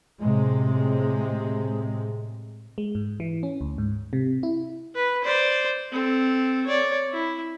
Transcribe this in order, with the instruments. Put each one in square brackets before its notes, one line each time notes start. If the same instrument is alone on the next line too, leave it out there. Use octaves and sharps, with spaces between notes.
[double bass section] A2 C3 G#3
[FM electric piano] G#3
G#2
E3
C#4
D2
G#2
C3
E4
[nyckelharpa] B4
C5 D5
C4 A4
C#5 D5
E4